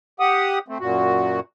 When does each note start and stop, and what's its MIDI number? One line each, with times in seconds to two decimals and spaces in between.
0.20 0.59 67
0.20 0.59 78
0.20 0.59 87
0.68 0.78 57
0.68 0.78 60
0.80 1.40 42
0.80 1.40 46
0.80 1.40 66